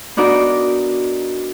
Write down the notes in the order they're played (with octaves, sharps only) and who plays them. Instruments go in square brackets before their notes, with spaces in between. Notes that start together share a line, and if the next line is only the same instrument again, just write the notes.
[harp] B3 D4 D#4 F#4 A#4 D5